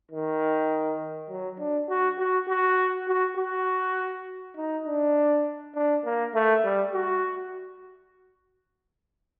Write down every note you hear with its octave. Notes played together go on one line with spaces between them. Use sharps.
D#3
F#3
D4
F#4
F#4
F#4
F#4
F#4
D#4
D4
D4
A#3
A3
G3
F#4